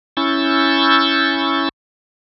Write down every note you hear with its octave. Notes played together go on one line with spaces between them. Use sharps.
C#4 E4 C#6 E6 G6 A6